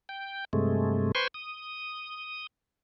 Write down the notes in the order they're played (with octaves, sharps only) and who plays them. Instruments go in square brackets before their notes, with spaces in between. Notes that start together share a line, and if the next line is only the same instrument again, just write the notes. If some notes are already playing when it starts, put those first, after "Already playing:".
[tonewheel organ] G5
G2 C3 G#3 A3
B4 C5 G5 G#5 C6 C#6
D#6